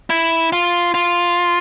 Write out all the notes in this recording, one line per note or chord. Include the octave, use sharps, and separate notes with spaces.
E4
F4
F4